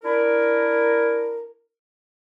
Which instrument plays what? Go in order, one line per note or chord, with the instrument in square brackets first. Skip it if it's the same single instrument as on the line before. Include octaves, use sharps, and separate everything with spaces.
[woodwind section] D4 E4 A#4